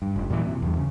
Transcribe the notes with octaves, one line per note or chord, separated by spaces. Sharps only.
G2
F1
F#2 A#2 D#3 E3
C3
E2 G2
C#3